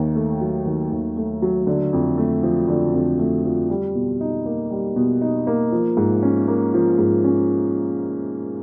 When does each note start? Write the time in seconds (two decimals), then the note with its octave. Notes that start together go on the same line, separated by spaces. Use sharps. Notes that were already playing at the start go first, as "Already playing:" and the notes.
Already playing: D#2 D#3
0.15 A3
0.41 F#3
0.66 D#3
0.91 D#2
1.17 A3
1.42 F#3
1.67 D3
1.93 F2
2.18 A3
2.43 F3
2.68 D3
2.94 F2
3.19 A3
3.45 F3
3.70 G3
3.95 B2
4.21 D#4
4.46 A#3
4.71 G3
4.96 B2
5.21 D#4
5.47 A#3
5.72 F3
5.97 G#2
6.23 C#4
6.48 A#3
6.74 F3
6.98 G#2
7.24 C#4